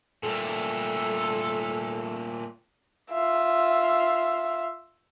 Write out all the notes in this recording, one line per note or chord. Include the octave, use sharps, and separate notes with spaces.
A#2 G3 A3 A4
F4 E5